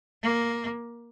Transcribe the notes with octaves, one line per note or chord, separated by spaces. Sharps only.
A#3